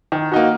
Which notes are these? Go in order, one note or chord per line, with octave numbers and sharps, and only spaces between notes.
D#3
A#3 D#4 F#4